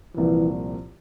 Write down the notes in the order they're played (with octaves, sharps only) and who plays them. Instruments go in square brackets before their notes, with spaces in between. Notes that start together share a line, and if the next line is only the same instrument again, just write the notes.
[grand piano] C2 A#2 F3 C4 F4 [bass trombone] E3